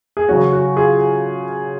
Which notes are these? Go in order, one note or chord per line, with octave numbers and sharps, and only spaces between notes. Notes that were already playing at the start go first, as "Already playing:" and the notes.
G#4
C#3 F#3 C#4 F#4
F#4
F4 G#4